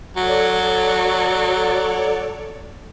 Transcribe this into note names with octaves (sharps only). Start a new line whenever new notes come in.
F#3 A4 C#5 D5